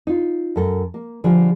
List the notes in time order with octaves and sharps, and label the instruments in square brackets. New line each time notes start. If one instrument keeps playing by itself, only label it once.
[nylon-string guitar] D#4 F4
F#2 A4 A#4
A#3
D3 F3 G3 F4 G#4